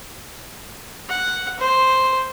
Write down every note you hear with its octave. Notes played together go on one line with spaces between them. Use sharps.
F#5
C5